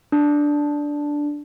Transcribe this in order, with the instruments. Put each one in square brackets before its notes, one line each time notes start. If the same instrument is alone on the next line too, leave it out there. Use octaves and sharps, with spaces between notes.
[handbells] D4